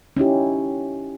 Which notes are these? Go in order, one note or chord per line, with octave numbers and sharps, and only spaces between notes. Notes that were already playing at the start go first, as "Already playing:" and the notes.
C#4 D#4 E4 G4